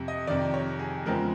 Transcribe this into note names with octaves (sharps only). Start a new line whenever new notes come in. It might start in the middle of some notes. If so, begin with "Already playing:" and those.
Already playing: F2 C3
D#5
F2 C3 D#3 D5
C#5
G#4
E2 C#3 F3 G#3 C4 A#4